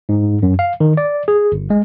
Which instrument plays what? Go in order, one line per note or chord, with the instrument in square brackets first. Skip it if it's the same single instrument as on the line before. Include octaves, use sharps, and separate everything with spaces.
[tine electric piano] G#2
F#2
F5
D#3
D5
G#4
G1
G#3